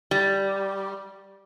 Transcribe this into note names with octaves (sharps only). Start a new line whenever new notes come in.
G3